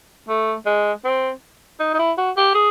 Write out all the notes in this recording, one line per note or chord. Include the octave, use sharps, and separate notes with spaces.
A3
G#3
C4
D#4
D#4
E4
F#4
G4
G#4